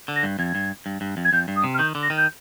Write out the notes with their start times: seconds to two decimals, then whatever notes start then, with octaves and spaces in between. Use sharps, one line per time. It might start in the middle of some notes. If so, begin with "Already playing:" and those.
0.08 D3
0.16 A#6
0.23 G2
0.39 F2 G#6
0.55 G2
0.86 G2
1.01 G2
1.17 F2
1.25 G#6
1.33 F2 G6
1.48 G2
1.56 D#6
1.64 C3
1.74 F6
1.78 D#3 G6
1.95 D3
2.03 A#6
2.10 D#3
2.17 G6